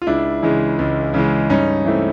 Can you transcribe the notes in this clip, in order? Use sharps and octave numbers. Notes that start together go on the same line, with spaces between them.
F4
C#2 D4 E4
C#3 E3 G#3
C#2
C#3 E3 G#3
G2 C#4 D#4
E3 A3 C4